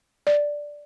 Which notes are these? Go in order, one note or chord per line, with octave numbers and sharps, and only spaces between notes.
D5